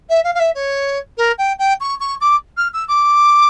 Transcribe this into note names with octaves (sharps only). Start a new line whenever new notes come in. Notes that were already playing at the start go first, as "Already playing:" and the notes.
E5
F5
F5
E5
C#5
A#4
G5
G5
C#6
C#6
D6
F6
E6
D6